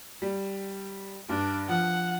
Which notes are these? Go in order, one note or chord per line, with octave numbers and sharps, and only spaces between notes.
G3
G2 D4
F3 F#5